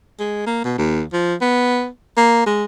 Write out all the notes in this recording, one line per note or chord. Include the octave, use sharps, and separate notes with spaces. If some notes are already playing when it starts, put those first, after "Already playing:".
G#3
A#3
B2
D#2
F3
B3
A#3
G#3